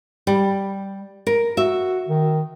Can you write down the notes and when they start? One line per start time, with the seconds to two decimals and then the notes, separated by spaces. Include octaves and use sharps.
0.27 G3
1.27 A#4
1.57 F#4 E5
2.08 D#3